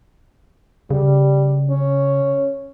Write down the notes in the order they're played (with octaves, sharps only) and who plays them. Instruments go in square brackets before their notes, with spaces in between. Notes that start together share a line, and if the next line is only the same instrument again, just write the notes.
[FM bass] C#3 [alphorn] G3
[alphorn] C#4